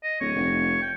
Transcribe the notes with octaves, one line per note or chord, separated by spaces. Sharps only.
D#5
D1 C#5
F1
G5